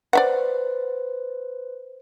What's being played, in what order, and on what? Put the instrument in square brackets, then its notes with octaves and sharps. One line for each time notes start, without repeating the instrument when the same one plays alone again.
[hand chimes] B4 C5 [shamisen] D5 E5 F#5